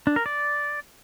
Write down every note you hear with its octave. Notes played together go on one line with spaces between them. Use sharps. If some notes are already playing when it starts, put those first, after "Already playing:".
D4
A#4
D5